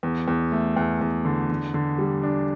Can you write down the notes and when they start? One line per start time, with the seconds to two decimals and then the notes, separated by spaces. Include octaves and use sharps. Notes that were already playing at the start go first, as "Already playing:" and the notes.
0.03 E2
0.28 E2
0.52 A3
0.76 E2
1.01 E2
1.25 D3
1.50 D3
1.74 D3
1.98 G3
2.23 D4